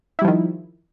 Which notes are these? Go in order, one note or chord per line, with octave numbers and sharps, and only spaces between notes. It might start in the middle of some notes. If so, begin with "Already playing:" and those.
D#3 F3 G3 E4